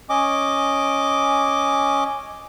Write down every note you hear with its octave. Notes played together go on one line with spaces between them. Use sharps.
C#4 D#5 D6